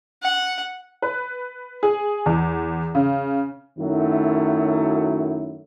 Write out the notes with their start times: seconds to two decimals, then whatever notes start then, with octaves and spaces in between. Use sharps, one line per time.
0.22 F#5
1.02 B4
1.83 G#4
2.26 E2
2.95 C#3
3.79 F#2 D#3 F#3 A3 E4